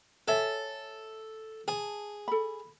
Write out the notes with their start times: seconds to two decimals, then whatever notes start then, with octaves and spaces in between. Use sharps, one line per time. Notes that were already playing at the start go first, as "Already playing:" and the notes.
0.28 A4 C#5 E5 G#5
1.68 G#4 A5
2.28 A4 B5